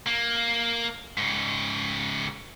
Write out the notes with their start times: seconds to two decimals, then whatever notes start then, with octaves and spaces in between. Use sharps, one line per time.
0.07 A#3
1.18 G#2 C#3